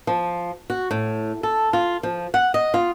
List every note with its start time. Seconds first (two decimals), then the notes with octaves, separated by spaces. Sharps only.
0.07 F3
0.70 F#4
0.91 A2
1.43 A4
1.73 F4
2.03 F3
2.34 F#5
2.54 D#5
2.74 F4